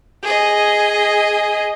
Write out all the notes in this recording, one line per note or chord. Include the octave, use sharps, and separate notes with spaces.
G#4 D#5